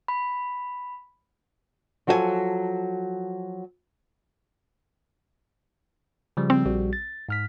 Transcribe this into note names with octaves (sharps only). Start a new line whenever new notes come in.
B5
F3 F#3 F#4 A4 C5 G#5
C#3 F3 G3
C4
A#1 G3 F#4
A6
G#2 F6 B6